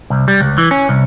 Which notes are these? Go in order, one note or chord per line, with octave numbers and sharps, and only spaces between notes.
C2
G3
C#2
E3
C#4
C2